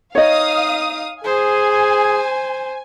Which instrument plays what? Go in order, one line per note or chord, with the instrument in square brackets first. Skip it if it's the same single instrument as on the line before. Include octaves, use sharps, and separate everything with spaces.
[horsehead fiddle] D#4 [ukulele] C#5 D#5 [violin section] F5 D#6
[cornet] G#4 [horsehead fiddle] C5 [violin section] G#5